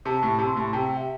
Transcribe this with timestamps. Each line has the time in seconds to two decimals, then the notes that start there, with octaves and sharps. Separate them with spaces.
0.05 C3 A5
0.23 A2
0.39 C3
0.46 C6
0.57 A2 A5
0.73 C3 G5
0.96 E5